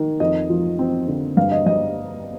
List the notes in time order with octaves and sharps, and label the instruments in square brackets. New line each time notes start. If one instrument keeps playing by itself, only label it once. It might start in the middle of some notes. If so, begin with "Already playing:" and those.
Already playing: [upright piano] D#3
F2 D#5
F3
C4
D3
G2 F5
D#5
G3 D#5